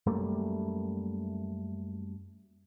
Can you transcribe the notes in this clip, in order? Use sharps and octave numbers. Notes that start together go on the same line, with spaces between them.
F#2 G3 A3 A#3